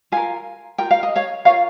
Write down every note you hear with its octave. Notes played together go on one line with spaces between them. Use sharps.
F4 A#4 F5 G#5
F4 A#4 G5
F5
D#5
C#5 F5
F4 A#4 C#5 F5